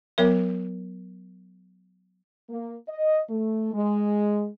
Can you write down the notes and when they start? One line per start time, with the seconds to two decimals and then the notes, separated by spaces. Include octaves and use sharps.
0.18 F#3 B3 A#4 E5
2.50 A#3
2.88 D#5
3.30 A3
3.73 G#3